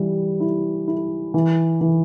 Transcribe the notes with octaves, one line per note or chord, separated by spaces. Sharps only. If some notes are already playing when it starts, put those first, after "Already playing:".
Already playing: E3 G3
E4
E4
E3
E3